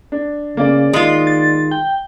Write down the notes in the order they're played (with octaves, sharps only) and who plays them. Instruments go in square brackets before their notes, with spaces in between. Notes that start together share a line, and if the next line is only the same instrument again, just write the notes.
[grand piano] D4
[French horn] C#3 [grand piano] A#3 D5
[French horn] D#3 [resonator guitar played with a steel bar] G#3 F4
[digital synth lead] A6
G5